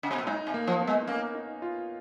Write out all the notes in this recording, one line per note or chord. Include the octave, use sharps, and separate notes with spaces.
C#3
B2
A#2
G#2 D#4
B2
A#3
F3
B3
G#3
D#4
A#3 C#4
D#4
F4